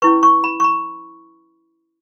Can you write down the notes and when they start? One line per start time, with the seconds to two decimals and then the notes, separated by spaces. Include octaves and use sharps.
0.02 C#4 E4 B4 C#6
0.23 C#6
0.44 B5
0.60 C#6
0.64 B5